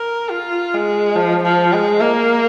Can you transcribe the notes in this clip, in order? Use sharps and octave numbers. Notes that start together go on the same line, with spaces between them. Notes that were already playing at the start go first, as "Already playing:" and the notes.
Already playing: A#4
F4
G#3
F3
F3
G#3
A#3